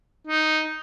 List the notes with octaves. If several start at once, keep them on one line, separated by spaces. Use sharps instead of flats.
D#4